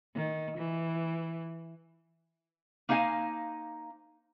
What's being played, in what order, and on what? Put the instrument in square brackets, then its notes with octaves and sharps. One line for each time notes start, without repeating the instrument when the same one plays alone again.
[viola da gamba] D#3
E3
[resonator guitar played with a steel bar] A#3 D#4 C5 F5 G5 G#5